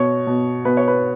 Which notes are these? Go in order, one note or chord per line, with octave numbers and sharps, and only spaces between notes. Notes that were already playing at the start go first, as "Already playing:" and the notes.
Already playing: B2 C#5
B2
B2 B4
C#5
B4